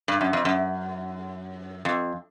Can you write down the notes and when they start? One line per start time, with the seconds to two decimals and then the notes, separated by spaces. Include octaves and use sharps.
0.08 G2
0.21 F#2
0.33 F2
0.45 F#2
1.85 F2